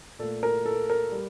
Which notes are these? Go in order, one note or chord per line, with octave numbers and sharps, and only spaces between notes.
A#2 A3 A4
A#4
A4
A#4
G3